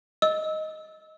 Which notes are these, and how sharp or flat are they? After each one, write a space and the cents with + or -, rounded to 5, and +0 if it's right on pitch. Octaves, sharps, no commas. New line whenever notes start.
D#5 +5 E6 -20